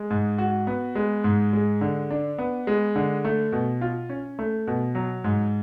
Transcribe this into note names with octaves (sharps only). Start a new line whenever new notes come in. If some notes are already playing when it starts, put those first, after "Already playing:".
Already playing: G#3
G#2
F#4
B3
G#3
G#2
G#3
D3
D4
B3
G#3
D3
A3
B2
F4
C#4
A3
B2
F#3
G#2